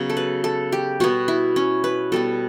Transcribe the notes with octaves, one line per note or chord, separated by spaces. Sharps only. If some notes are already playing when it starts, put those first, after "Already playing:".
Already playing: C#3 F#3 B3
A4
B4
A4
G4
B2 G3 B3 F#4
E4
C#4
B4
B2 G3 B3 A4